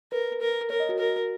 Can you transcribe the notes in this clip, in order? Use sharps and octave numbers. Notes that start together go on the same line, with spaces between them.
A#4 B4
A#4
A#4 C#5
D#5
F#4
A#4